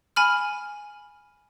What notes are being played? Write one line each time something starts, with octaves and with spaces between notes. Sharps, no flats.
G#5 B5 F6